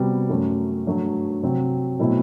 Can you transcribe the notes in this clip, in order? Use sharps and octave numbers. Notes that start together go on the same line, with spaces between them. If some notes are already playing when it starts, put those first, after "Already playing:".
Already playing: C3 G3 B3 F#4
F#2 F#3 A3
G2 F#3 A3
C3 F#3 C4
B2 F#3 A3 C4 E4